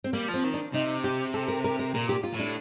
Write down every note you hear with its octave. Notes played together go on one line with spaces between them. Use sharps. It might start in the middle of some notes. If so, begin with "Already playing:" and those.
C4
G3 A#3
F3
C4
D#3
D4
C3 D#4
G4
A4
A#4
A#4
A#4
A#2 A#4
G4
F4
A2
D4